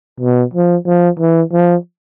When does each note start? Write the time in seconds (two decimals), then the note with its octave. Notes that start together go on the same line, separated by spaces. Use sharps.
0.21 B2
0.54 F3
0.86 F3
1.19 E3
1.53 F3